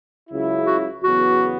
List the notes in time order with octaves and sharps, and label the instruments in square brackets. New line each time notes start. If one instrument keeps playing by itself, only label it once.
[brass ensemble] C#2 C#3 F#3 E4
[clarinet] F#4
[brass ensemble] E2 C#3 F#3 B3 [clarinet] F#4